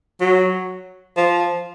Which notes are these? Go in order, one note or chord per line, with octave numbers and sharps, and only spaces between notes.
F#3
F3